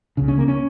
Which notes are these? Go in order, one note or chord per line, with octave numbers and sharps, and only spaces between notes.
C#2 C#3
C#4
A#3
C#4